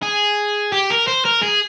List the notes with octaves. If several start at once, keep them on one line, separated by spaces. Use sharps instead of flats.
G#4
G4
A#4
C5
A#4
G#4